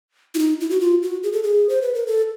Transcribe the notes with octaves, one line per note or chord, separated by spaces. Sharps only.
E4
D#4
E4
F#4
F4
F#4
G#4
A4
G#4
C5
B4
A#4
A4